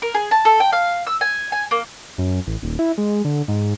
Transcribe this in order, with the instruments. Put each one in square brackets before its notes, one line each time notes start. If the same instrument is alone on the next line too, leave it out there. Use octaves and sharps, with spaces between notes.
[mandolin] A#4
G#4
A5
A4
G5
F5
E6
G#5
G#5
A#3
[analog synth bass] F#2
A1
D#1
E4
G#3
D3
G#2